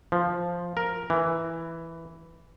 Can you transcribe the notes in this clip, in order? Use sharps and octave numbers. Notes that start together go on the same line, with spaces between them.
F3
A#4
E3